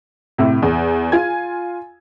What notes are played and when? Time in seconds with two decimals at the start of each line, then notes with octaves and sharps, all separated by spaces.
0.38 A2 C3
0.62 E2
1.12 F4 G#5 G#6